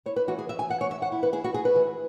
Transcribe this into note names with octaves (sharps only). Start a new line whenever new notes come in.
E4 C#5
B4
E3 F#4
G#4
E3 E5
G#5
E3 F#5
C#5
E3 E5
F#5
E4
B4
E4 G#4
F#4
E4 G#4
B4
E3